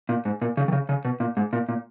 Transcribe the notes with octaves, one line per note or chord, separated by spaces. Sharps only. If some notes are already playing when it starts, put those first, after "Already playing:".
A#2
G#2
A#2
C#3
D#3
C#3
C#3
B2
A#2
G#2
A#2
A#2